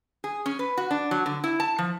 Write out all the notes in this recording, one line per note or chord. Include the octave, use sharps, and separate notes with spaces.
G#4
C#4
B4
F#4
D4
F#3
D3
E4
A5
F3